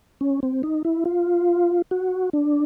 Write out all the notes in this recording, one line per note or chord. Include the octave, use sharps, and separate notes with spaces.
C#4
C4
D#4
E4
F4
F#4
D4